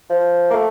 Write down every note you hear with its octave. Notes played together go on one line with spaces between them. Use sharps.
F3
A#3
A3